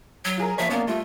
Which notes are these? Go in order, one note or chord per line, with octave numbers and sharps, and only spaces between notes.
F#3
F4 G#4 A#4
F3 A#3 C#5 E5
A#3 B3 C#4 D4
G3 A3 F4